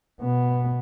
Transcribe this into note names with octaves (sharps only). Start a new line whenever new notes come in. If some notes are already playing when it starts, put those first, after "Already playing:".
B2 B3